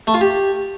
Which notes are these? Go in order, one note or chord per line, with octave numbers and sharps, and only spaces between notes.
A3
F4
G4